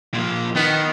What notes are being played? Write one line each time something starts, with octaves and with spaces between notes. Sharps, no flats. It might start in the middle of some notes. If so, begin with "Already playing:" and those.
A#2 F3
D#3 B3